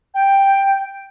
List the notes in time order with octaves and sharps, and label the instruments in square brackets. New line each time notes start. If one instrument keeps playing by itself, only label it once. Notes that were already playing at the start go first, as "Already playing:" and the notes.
[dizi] G5